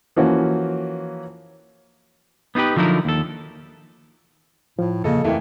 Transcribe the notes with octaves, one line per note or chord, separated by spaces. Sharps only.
E3 F3 A#3 C#4 F4 F#4
B3 D#4 F4 G4 B4
D3 F3 F#3 D#4 E4 A#4
D#2 A4
A2 F3
E2 A#2 C#3 B3 A4 D#5
F2 E3 A3 A#3 G#4 G5